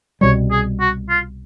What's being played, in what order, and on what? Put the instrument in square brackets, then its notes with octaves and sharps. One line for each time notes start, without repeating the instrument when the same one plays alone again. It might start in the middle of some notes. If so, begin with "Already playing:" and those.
[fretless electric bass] C2 B2 G3 [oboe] C#5
[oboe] G#4
F#4
F4